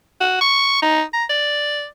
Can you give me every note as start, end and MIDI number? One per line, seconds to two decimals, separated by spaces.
0.21 0.38 66
0.41 0.77 85
0.82 1.03 63
1.13 1.24 82
1.30 1.86 74